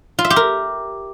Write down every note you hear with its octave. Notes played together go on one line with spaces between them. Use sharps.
F4
E5
G4
A#4